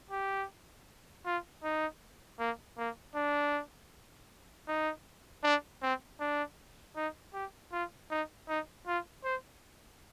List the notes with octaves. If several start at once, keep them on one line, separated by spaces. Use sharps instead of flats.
G4
F4
D#4
A#3
A#3
D4
D#4
D4
C4
D4
D#4
G4
F4
D#4
D#4
F4
C5